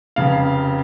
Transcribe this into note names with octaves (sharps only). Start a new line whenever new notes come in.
F1 C#3 F5